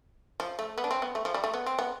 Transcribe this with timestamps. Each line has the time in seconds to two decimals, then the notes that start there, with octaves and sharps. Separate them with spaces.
0.40 F3
0.59 A3
0.78 B3
0.84 D4
0.91 C4
1.02 B3
1.15 A3
1.25 F3
1.34 G3
1.44 A3
1.54 B3
1.66 C4
1.79 B3